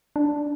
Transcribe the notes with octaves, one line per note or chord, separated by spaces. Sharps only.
D4